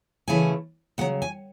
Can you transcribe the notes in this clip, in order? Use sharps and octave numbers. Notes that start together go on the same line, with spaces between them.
C#3 E3 A3 C#4 E4 G#5
D2 C#3 F#3 F#5
G#5